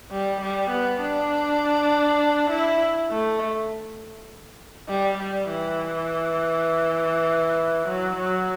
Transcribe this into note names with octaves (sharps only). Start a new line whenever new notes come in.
G3
G3
B3
D4
E4
A3
G3
G3
E3
F#3
F#3